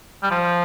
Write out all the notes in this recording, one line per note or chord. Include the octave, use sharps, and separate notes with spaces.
G3
F3